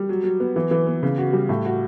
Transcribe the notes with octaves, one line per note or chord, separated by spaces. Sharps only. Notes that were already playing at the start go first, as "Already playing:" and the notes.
Already playing: G3
F#3
F#3
B3
E3
E3
B3
C#3
F#4
G3
A2
F#4